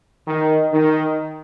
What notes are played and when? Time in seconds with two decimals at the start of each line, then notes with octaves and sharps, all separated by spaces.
0.27 D#3
0.72 D#3